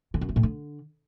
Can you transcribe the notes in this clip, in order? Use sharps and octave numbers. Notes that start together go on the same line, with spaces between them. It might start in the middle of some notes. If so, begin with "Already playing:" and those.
D3
F#2
A3
A2
D3